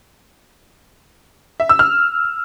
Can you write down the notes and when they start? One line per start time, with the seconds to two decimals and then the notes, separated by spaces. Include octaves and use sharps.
1.60 E5
1.69 E6
1.79 F6